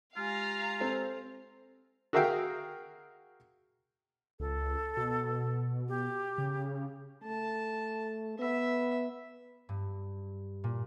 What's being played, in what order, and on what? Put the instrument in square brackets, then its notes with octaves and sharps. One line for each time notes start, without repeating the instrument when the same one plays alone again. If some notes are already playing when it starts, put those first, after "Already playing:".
[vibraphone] G#3 G4 G#5 [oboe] F4 [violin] F5 A#5
[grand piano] C4 A4
[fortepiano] F#4 G#4 A#4 E5 F5 G5
[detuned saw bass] C#2 [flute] A4
[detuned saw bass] B2
[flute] G4
[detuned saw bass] C#3
[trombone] A3 [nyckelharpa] A5
[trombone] B3 [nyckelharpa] E5
[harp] G2
A#2